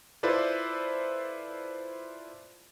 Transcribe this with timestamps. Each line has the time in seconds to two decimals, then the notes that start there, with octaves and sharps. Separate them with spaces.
0.23 E4 F4 A4 B4 C5 D5